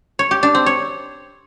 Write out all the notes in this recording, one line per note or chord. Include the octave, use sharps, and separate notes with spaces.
C#5
G4
D4
C4
C#5